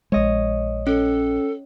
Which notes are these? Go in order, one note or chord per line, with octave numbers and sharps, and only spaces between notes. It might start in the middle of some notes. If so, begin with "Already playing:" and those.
A#1 G#3 C#5 D#5
C#4 A4